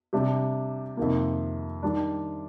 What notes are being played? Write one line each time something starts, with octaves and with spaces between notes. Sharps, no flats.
C3 G3 D4 G4
F2 C3 D#3 A#3
D#3 G3 D4